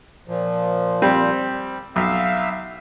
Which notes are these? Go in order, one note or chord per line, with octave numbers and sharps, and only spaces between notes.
A#2 F3
G3 C4
B1 E5 F5